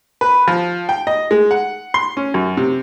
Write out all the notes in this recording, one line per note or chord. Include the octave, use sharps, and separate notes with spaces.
B4
F3
G5
D#5
G#3
F#5
C6
C#4
F#2
C3